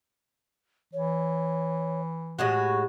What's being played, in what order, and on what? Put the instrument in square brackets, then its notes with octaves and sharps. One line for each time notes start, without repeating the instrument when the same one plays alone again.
[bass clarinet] E3 [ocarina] C#5
[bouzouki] A2 G#3 F#4 [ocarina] G4